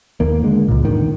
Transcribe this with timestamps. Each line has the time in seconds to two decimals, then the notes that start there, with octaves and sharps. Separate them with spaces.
0.20 D#2 D#3 A#3
0.43 D3 G#3
0.68 C#2 A#2
0.83 E2 A2 D3 D#3